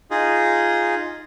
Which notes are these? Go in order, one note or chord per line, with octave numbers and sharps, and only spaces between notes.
D#4 F4 G#4